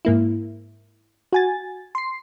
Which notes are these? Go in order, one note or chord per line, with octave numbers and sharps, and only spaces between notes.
G#2 A#3 E4
F#4 G#5 A6
C6 C7